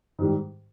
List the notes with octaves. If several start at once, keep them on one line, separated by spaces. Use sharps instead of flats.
G#2 D#3 G3